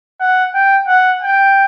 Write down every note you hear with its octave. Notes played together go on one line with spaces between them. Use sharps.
F#5
G5
F#5
G5